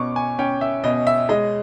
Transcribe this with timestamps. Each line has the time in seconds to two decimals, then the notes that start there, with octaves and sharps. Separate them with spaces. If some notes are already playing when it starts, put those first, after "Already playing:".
Already playing: B2 C#4 C#6 D6
0.16 G#5
0.39 C#4 G5
0.61 E5
0.84 B2 D#5
1.07 E5
1.29 G#3 D#5